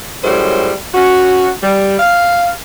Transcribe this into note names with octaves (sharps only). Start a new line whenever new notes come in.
F#2 A2 G3 G#3 C5
C#4 F#4
G3
F5